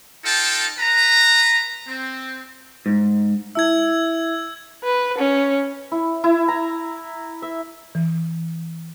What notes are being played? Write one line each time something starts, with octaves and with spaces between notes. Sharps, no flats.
D#4 F4 A4 G5 A5
B4 A#5
C4
G#2
E4 E5 E6 G#6
B4
C#4
E4
E4
A#5
E5
E3